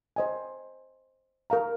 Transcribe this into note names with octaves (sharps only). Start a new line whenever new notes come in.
C5 D#5 G#5
A#4 F5 A#5